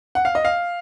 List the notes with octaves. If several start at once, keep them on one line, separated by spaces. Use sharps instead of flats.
F#5
F5
D#5
F5